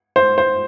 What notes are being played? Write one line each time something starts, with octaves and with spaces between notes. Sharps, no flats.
C5
C5